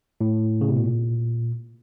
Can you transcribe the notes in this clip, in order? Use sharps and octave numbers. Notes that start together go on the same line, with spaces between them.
A2
C#3
C3
B2
A#2